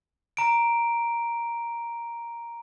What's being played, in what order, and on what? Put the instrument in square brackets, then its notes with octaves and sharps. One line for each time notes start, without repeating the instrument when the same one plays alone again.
[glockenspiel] A#5 D7